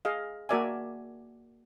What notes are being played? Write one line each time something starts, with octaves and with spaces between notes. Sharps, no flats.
G#4 D#5 F5
A#3 F#4 A#4 D5 E5 G#5